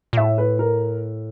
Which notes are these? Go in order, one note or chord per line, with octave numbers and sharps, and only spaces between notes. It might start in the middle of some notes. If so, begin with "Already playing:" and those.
A#2
A2 E5
B4
A#4